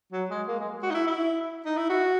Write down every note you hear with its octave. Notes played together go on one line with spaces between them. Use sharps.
F#3
G#3
A#3
G#3
F#4
D#4
E4
E4
D#4
E4
F#4